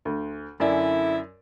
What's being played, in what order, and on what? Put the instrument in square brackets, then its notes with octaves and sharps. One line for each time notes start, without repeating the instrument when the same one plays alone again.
[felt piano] D2
[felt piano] F#2 D5 G#5 [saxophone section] D3 E4